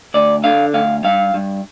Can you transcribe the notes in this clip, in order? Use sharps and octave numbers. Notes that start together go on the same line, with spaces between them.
D2 D5
D3 F5
D2 F5
G2 F5
G2